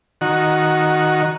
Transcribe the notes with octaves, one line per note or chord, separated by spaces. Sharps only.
D#3 F#4